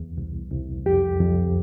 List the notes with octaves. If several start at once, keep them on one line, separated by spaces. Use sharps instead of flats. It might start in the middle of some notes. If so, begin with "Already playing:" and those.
Already playing: E2
C2
C2
F2 G4
F2